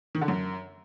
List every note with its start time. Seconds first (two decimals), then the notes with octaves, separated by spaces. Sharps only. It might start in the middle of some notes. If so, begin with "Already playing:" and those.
0.15 D#3
0.21 D3
0.28 F#2